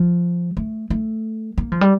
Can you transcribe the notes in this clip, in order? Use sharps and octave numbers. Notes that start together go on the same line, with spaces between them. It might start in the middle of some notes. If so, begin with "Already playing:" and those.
Already playing: F3
A3
A3
A#3
F3
G3